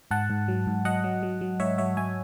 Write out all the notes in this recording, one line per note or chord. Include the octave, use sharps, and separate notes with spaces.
G#2 F#5 A5
G#2
F#3
G#2
F#3 D#5 F#5
F#3
F#3
F#3
G#2 C#5 E5
F#3 C#5 E5
F#3 E5 G#5